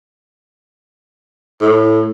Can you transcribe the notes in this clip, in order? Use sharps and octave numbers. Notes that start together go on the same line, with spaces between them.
A2